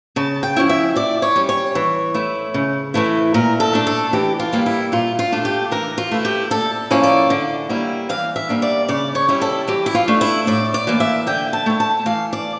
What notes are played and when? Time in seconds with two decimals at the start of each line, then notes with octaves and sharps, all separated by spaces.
0.16 C#3 A5
0.43 G5
0.56 F3 C#4 E4
0.69 E5
0.96 A#2 D5
1.22 C#5
1.36 G3 C#4
1.49 C#5
1.75 E3
2.14 A3 E4
2.54 C#3
2.94 E3 A3 E4
3.34 A#2 A#4
3.60 A4
3.73 A3 D4
3.87 A4
4.13 E3 G4
4.40 F4
4.53 G3 A#3 E4
4.66 E4
4.92 A#2 F4
5.19 F4
5.32 A3 D4
5.45 G4
5.71 E3 A#4
5.98 F4
6.11 A3 E4
6.25 G4
6.50 A#2 A4
6.91 F3 A#3 C#4 E4
7.03 D5
7.30 D3
7.69 G3 A#3 E4
8.09 E3 F5
8.36 E5
8.49 G3 A#3 D4
8.62 D5
8.89 C#3 D5
9.15 C#5
9.28 G3 C#4 E4
9.42 A4
9.68 E3 G4
9.86 E4
9.95 F4
10.08 A3 D4
10.21 E4
10.47 A2 D5
10.74 D5
10.87 E3 A#3
11.00 E5
11.27 D3 G5
11.53 A5
11.66 A3 E4
11.80 A5
12.06 E3 F5
12.33 D5